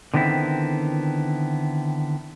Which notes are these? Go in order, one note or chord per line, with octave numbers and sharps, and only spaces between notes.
D3 D#3 B3 C4 E4